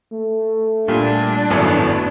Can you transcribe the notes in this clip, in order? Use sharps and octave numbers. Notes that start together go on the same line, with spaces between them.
A3
A#2 G3 D4 G#5 C6
G#1 F#2 A2 F#3 A#3 B3